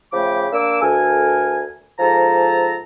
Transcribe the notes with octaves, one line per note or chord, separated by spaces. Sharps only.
C#3 F3 A3 G5 B5 D6
A#3 D4 D6 E6
D2 A4 A#4 G#5
G#2 F3 A4 A5 A#5